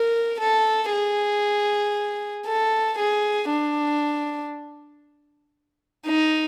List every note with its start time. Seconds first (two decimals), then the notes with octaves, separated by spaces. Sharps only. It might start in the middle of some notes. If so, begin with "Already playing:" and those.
Already playing: A#4
0.41 A4
0.92 G#4
2.47 A4
2.98 G#4
3.50 D4
6.07 D#4